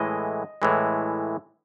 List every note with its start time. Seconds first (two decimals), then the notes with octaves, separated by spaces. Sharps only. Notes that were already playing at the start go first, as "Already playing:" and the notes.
Already playing: A2 E3 G#3 D#5
0.62 A2 E3 G#3